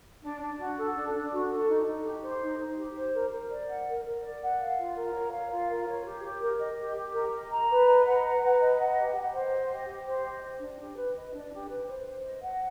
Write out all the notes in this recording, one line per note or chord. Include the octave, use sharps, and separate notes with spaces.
D4
D4
F#4
A4
D4
D4
F#4
A4
D#4
D#4
G4
C5
D#4
D#4
G4
C5
A#4
A#4
D5
F#5
A#4
A#4
D5
F#5
F5
F4
A#4
C#5
F5
F4
A#4
C#5
G4
G4
A#4
D#5
G4
G4
A#4
D#5
A#5
B4
D#5
F#5
A#5
B4
D#5
F#5
G4
G4
C5
D#5
G4
G4
C5
D#5
D#5
D4
G4
B4
D#5
D4
G4
B4
C5
C5
D#5
F#5